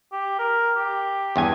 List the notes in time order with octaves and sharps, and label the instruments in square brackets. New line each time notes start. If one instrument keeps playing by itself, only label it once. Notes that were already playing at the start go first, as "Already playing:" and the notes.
[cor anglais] G4
A#4
G4
[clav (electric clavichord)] E2 G2 G#5